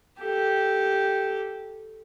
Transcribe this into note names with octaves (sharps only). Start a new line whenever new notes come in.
G4 A4